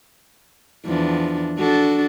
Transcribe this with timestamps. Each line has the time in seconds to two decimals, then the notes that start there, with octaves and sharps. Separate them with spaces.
0.86 E2 F3 D4
1.59 D4 F#4 A4